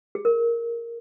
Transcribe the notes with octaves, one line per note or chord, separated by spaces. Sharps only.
G#4
A#4